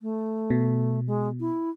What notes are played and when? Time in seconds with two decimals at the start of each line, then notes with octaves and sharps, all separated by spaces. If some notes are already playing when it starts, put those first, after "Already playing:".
0.01 A3
0.50 B2
1.07 G#3
1.40 E4